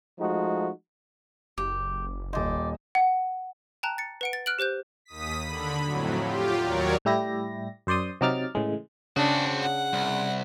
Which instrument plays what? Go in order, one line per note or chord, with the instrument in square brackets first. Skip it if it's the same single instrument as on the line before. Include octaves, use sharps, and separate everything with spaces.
[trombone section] F3 G#3 A3 D#4 F#4
[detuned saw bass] F#1 [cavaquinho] G4
[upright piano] D#1 D#5 [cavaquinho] C5 D5
[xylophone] F#5
G5 A5 A#5 F#6
A6 C#7
B4 F#5 D7
A6
F6 F#6 D7 F#7
G4 C5 F#6 G6
[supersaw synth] D#2 D#6 B6
D3 B5
F2 A2 F#3
F4 G4
D#2 F#3 A#4 C#5 D5
[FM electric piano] A2 G3 E4 G4 A#6
F#2 C5 D5 C6 D#6
C3 F#3 D#4 D6 F6 A6
A2 C#3 E3 G#3
[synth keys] C#3 [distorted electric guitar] C4 F#4 [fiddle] D4
[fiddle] F#5
[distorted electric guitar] C2